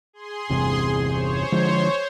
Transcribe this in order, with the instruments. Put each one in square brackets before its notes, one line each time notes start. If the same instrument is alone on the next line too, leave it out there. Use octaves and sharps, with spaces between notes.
[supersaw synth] G#4 C6
[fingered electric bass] G1 E2 C3
[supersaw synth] C5 C#5
[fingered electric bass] D3 F3 G#3